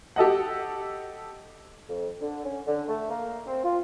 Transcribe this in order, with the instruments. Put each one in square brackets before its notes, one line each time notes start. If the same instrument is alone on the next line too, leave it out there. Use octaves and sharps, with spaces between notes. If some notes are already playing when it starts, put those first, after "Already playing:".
[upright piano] G4 A4 D#5 F#5
[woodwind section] F2
D3
C#4
D3
A3
A#3
C4
F4